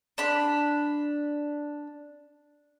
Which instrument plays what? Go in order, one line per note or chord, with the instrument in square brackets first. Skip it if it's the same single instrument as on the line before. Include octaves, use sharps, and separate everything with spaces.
[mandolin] D4 B5